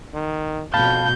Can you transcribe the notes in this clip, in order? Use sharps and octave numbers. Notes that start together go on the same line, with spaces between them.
D#3
F2 B2 F5 A5 B5 G6